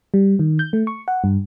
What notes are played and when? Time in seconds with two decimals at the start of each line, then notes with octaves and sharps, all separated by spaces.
0.14 G3
0.39 D#3
0.59 G6
0.73 A3
0.87 C#6
1.08 F#5
1.24 G2